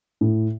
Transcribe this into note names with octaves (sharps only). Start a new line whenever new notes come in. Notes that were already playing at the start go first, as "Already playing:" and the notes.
A2